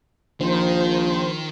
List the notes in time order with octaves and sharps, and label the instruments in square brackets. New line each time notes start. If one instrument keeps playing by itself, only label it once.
[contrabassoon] A#1 [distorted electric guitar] D#3 [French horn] F3 [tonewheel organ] C5